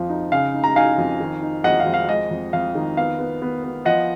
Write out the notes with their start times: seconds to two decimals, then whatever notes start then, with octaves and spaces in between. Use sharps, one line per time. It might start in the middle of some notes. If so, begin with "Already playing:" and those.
Already playing: F2 F3
0.09 D#4
0.32 C#3 F5
0.54 D#4
0.64 A#5
0.76 D#4 F5 G#5
0.98 F2
1.20 D#3
1.42 D#4
1.64 F2 D#5 F#5
1.80 F5
1.86 F2
1.94 F5
2.09 G#3 D#5
2.31 F2
2.53 F2 F5
2.75 D#3
2.97 B3 F5
3.19 B3
3.42 B3
3.64 B3
3.85 F3 D#5 F#5